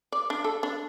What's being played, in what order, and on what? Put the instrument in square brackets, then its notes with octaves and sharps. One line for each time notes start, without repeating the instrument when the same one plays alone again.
[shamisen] D5
D4
A4
D4